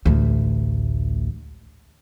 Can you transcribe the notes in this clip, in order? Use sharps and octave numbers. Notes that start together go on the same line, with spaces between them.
A1 D2